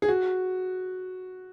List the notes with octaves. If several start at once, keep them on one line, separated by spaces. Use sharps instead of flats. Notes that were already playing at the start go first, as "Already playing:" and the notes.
G#4
F#4